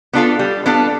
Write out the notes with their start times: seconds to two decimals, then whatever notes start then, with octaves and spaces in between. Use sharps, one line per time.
0.13 B3 D4 F4 A4
0.39 G3
0.66 B3 D4 F4 A4